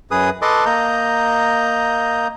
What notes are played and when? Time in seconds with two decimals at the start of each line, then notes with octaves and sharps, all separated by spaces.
0.11 F#2 G#4 B4 D#6
0.42 A4 B4 D#5 A5 C6 D6
0.66 A#3 D#5 A#5 G6